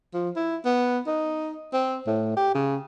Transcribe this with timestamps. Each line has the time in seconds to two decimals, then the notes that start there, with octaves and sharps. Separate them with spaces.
0.13 F3
0.36 E4
0.65 B3
1.07 D#4
1.73 C4
2.07 A2
2.37 G4
2.55 C#3